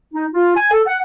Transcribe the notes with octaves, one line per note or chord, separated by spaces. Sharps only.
D#4
F4
G#5
A4
F#5